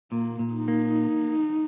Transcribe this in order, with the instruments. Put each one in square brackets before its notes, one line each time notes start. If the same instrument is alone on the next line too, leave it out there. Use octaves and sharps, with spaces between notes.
[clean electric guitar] A#2 [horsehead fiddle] A#3
[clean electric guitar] A#2
[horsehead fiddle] D#4
[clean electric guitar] A#3